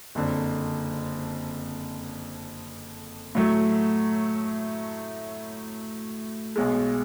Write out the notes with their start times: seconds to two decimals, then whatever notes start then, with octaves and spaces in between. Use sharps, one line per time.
0.15 F#1 F2 D3
3.35 A2 F#3 A3
6.56 B1 B2 G#3